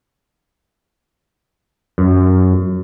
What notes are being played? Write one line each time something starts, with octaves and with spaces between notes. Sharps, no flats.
F#2